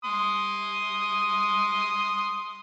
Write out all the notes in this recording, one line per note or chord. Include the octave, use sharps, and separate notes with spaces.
C6 D#6